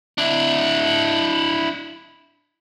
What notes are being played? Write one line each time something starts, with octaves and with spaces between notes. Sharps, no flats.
D4 E4